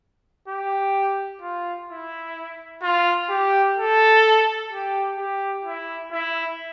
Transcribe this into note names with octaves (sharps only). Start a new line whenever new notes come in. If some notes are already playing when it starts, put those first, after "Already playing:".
G4
F4
E4
F4
G4
A4
G4
G4
E4
E4